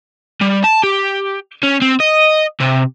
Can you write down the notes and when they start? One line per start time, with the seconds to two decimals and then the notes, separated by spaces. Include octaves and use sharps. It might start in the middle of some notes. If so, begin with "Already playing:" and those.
0.41 G3
0.64 A5
0.84 G4
1.63 C#4
1.82 C4
2.00 D#5
2.60 C3